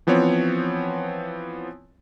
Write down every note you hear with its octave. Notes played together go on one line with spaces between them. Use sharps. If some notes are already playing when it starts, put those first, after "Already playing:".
E3 F3 B3 C4 C#5